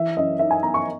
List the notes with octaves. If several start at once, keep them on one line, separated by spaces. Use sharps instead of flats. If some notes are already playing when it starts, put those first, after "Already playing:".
Already playing: E3 E5
F#2 D#5
D#4 E5
G#5
B3 A#5
C#6